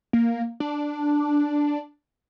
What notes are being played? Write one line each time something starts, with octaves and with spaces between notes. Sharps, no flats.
A#3
D4